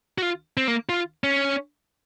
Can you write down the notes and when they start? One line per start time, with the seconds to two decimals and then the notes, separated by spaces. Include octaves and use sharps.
0.18 F#4
0.22 F4
0.57 C4
0.68 A#3
0.89 F4
1.24 C#4